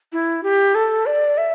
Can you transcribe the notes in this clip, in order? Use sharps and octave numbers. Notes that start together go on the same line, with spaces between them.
E4
G4
A4
D5
E5